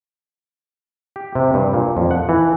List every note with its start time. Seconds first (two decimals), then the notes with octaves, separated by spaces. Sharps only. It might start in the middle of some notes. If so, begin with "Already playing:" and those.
1.16 G4
1.35 C3
1.54 G2
1.73 A#2
1.97 F2
2.11 F#5
2.29 E3